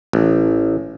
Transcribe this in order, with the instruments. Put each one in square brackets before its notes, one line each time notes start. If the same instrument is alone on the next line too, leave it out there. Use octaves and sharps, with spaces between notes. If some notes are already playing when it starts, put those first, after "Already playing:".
[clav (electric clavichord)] A1